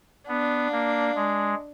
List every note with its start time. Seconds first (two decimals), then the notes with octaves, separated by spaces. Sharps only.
0.28 B3 D4
0.72 A#3
1.16 G#3